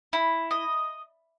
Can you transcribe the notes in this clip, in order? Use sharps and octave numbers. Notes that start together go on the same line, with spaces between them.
E4
D#5